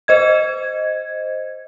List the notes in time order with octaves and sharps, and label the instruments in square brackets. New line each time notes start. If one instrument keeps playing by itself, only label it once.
[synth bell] C5 D#5 G#6